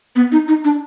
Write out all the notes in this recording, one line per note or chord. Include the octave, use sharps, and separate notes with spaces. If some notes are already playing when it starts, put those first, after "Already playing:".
B3
D#4
D#4
D4